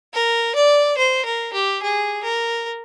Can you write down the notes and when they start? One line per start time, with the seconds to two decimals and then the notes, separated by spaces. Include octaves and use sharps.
0.13 A#4
0.55 D5
0.98 C5
1.25 A#4
1.53 G4
1.83 G#4
2.24 A#4